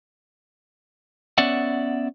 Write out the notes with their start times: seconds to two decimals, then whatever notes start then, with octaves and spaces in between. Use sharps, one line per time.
1.38 B3 C#4 D5 E5 F#5